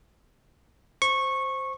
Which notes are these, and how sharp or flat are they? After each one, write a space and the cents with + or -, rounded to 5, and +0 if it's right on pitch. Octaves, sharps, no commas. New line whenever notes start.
C5 +0 C#6 -15